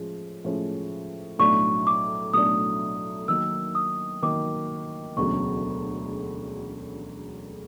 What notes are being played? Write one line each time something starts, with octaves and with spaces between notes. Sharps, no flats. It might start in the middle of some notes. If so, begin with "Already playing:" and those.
Already playing: A2 F3 G#3 C#4
A2 F3 G#3 C#4
B1 A2 F#3 A3 D4 C#6
D6
B1 A2 F#3 A3 D4 D#6
D#3 F#3 A#3 E6
D#6
D#3 F#3 A#3 D6
E1 D2 C#3 F#3 C#6